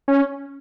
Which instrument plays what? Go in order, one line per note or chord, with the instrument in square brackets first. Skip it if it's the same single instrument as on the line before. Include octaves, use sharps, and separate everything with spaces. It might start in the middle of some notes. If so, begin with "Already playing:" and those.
[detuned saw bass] C#4